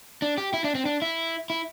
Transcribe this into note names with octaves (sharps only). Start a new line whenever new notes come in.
D4
G4
E4
D4
C4
D4
E4
E4